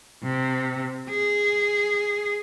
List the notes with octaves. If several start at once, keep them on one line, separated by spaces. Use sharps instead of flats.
C3
G#4